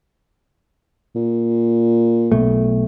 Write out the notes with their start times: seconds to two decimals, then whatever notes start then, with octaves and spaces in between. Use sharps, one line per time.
1.15 A#2
2.32 B1 B2 A3